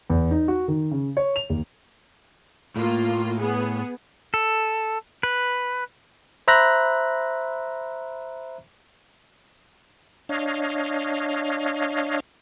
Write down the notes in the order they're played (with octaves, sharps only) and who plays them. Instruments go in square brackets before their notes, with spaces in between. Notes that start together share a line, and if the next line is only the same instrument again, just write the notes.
[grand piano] E2
D#4
F#4
D#3
C#3
C#5
F7
D#2
[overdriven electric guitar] A2 [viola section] A#3 F4
[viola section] B3 G#4
[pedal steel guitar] A4
B4
[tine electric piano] C5 E5 A#5 B5 F#6 A#6
[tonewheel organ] D4 C#5 D#5 F5